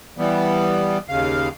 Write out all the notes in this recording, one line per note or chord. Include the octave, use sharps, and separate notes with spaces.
E3 G3 B3
D#2 C#3 F5